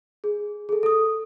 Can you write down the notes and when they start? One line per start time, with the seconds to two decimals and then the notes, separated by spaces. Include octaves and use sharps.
0.24 G#4
0.69 G#4 A4
0.83 A4 D#6